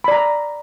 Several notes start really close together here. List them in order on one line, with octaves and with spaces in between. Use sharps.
B5 D5 A#5